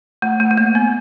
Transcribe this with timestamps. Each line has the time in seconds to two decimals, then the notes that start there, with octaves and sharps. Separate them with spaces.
0.22 A3
0.40 A3
0.51 A3
0.58 A#3
0.75 B3